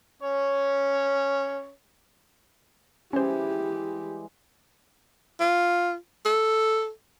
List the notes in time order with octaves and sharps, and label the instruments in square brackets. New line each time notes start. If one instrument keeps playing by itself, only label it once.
[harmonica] C#4 C#5
[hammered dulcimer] E3 G3 G#3 [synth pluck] C#4 C5 [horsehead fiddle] G4
[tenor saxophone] F4
A4